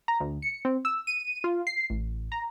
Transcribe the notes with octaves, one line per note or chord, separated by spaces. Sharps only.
A#5
D2
C#7
C4
E6
D#7
F4
C7
A1
A#5